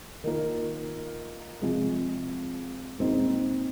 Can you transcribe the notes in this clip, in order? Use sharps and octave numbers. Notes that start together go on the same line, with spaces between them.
D#3 A#3 F4 A#4
C3 F3 G#3
A#2 G#3 C4 D#4